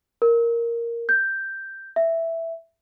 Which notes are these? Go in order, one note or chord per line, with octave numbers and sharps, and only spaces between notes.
A#4
G6
E5